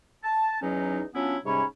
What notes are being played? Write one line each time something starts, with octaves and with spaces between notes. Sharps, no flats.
A5
E2 F#3 C#4 D#4
F#3 B3 C#4 D4 E4 F4
G#2 C3 G3 C#4 C#5 B5